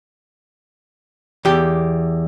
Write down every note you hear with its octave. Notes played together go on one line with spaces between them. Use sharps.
E2 G4